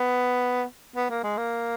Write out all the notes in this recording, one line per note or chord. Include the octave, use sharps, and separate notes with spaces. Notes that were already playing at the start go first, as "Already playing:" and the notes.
Already playing: B3
B3
A#3
G#3
A#3